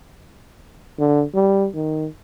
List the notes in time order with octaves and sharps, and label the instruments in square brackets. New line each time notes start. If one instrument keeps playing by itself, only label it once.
[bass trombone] D3
G3
D#3